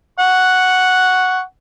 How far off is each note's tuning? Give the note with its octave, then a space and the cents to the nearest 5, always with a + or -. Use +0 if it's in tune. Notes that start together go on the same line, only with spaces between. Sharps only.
F#5 +0 C#6 +5